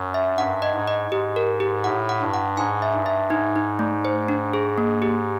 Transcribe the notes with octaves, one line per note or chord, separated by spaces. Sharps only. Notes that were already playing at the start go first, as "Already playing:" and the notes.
Already playing: F#2
E5
G2 F#5
D#5
G#2
D#5
G#2 G4
A#4
G4
A2 F#5
F#5
G2
F#5
G#2 G#5
E5
G2
E5
G#2 D#4
D#4
A3
C5
D4
G#4
A#3
G4